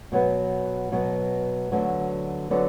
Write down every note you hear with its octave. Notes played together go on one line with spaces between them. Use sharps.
B2 F#3 B3
B2 F#3 B3
D2 D3 F#3 B3
D3 F#3 B3